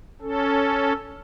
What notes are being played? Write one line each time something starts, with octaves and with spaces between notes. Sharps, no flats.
C#4 A4